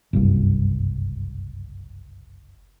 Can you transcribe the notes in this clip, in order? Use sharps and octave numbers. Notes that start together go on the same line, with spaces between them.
F#1 C2 G2